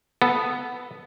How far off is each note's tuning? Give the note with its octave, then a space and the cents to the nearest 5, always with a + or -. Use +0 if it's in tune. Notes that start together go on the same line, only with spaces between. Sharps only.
B3 +0 A4 +0